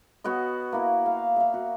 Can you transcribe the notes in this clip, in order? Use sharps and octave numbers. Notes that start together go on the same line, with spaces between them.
B3 F#4 C#5 D#5
A#3 E4
F5
E5 F5
F#4